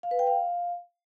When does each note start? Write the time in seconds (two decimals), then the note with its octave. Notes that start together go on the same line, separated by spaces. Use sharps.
0.03 F5
0.11 B4
0.19 G5
0.27 F5